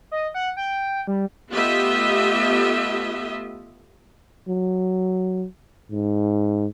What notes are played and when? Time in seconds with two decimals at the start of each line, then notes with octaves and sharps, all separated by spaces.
0.11 D#5
0.34 F#5
0.57 G5
1.07 G3
1.52 A3 B3 F4 G4 D#5 E5
4.48 F#3
5.92 G#2